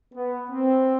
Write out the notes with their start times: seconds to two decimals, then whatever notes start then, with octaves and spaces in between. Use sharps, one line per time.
0.14 B3
0.50 C4